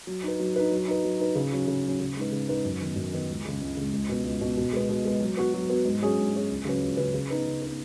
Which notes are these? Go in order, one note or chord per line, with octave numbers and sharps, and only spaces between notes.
F#3
D#4 B4
F#3
D#4 B4
F#3
D#4 B4
F#3
D#4 B4
C#3
F#3 C#4
C#3
F#3 C#4
C#3
G#3 D#4 B4
C#3
G#3 D#4 B4
F#2
D#3 B3
F#2
D#3 B3
C#2
C#3 G#3
C#2
C#3 G#3
C#2
B2 B3
C#2
B2 B3
B2
G#3 B3
B2
G#3 B3
F#3
B3 F#4
F#3
B3 F#4
G#2
F#3 C#4 G#4 C#5
G#2
F#3 C#4 G#4 C#5
C#2
C#3 F#3 C#4 B4
C#2
C#3 F#3 C#4 B4
C#3
B3 D#4 B4
C#3
B3 D#4 B4